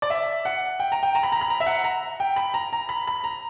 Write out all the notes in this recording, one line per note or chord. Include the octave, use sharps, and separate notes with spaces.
D5
E5
F#5
G5
A#5
G5
A#5
B5
A#5
B5
A#5
E5
F#5
A#5
G5
B5
A#5
A#5
B5
B5
A#5